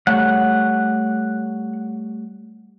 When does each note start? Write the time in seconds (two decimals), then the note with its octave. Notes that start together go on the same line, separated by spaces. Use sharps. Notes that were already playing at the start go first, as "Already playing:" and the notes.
0.07 G3 A3 C#5 F#5